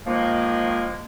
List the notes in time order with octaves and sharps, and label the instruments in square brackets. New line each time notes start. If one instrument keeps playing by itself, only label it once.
[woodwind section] D#3 F3 G#3 A#3